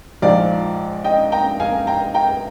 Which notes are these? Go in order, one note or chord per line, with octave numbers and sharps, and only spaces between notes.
A#1 G#2 F3 D5 F5
D#5 G5
G5 A#5
F5 G#5
G5 A#5
G5 A#5